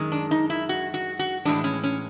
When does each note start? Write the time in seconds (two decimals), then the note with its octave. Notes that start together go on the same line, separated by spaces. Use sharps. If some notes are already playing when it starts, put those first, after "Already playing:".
Already playing: F#2 D#3 G#3
0.12 D4
0.31 D#4
0.50 E4
0.69 F#4
0.94 F#4
1.19 F#4
1.45 A2 E3 G#3 D4
1.64 C#4
1.84 C#4